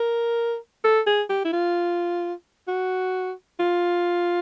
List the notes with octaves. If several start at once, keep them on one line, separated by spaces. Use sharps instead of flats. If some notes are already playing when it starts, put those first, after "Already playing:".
Already playing: A#4
A4
G#4
G4
E4
F4
F#4
F4